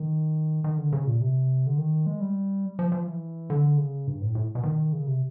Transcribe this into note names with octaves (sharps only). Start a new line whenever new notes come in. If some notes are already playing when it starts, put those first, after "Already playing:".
Already playing: D#3
D#3
D3
C#3
A#2
C3
D3
D#3
G#3
G3
F3
F3
E3
D3
C#3
G2
A2
A2
B2
D#3
C#3
C3